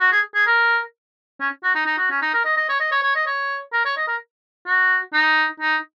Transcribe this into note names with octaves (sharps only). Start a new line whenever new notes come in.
F#4
G#4
G#4
A#4
C#4
F#4
D#4
D#4
F#4
C#4
D#4
A#4
D#5
D#5
C#5
D#5
C#5
C#5
D#5
C#5
A#4
C#5
D#5
A#4
F#4
D#4
D#4